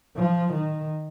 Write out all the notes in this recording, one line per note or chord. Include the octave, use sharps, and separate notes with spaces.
F3
D#3